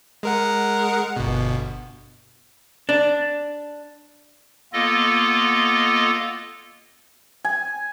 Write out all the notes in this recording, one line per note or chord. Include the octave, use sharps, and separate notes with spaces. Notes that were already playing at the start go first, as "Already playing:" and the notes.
G#3 A#4 F#5
G1 B2
D4
A#3 B3 F4 A4 D#5
G#5